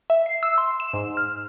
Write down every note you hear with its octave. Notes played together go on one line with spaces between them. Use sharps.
E5
C7
E6
C6
E7
G#2
F6